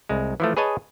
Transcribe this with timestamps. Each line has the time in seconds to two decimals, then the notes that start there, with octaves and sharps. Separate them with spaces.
0.09 C2 G#3
0.40 E3 F3 A3
0.57 G#4 B4 C#5 D#5 G#5 A5